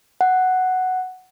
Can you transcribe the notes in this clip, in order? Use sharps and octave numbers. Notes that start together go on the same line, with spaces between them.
F#5